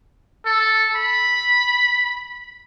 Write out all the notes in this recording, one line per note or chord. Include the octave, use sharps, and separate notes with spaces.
A4
B5